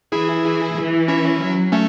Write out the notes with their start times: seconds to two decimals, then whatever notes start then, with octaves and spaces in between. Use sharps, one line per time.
0.12 E3 E4 G#4
0.77 E3
1.08 C#4 E4
1.40 F#3
1.72 A3 C#4